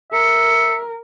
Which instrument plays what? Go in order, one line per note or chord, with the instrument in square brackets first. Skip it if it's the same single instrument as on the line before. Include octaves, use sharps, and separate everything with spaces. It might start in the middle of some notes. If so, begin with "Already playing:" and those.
[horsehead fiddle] A#4 [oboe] E5 [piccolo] C#7